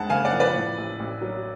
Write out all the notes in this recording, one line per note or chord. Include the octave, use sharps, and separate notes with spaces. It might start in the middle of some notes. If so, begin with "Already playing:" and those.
Already playing: F2 G#3 F#5 A5
F#1 F5 G#5
D5 F#5
F3
B4 D5
A2
A1
A1
F#3